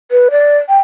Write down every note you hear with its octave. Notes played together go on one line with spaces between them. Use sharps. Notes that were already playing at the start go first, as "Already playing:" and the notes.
B4
D5
G5